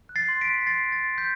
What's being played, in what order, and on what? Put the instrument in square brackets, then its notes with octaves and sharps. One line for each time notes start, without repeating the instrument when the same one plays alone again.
[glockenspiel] F#6
A6 C7
C6
B6 D7
F#6
C6 A6 C7
F#6
A6
C6
G6 B6